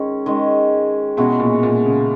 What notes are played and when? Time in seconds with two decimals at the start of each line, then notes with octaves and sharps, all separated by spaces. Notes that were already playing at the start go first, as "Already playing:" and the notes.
Already playing: D#3 G#3 C#4
0.26 D#3 G#3 C#4
1.17 B2 E3 G#3 C#4 F#4
1.39 A#2
1.63 A#2
1.86 C#3